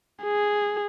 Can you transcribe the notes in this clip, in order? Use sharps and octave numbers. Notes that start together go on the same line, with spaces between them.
G#4